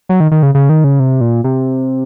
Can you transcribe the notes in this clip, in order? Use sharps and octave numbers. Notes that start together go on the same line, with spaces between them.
F#3
D#3
D#3
C#3
C#3
D#3
C#3
C3
A#2
C3